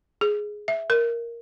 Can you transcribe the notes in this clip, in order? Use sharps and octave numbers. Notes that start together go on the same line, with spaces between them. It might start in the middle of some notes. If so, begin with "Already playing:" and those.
G#4
E5
A#4